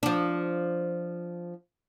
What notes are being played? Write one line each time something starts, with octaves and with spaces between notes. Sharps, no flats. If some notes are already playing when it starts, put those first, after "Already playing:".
F3 D4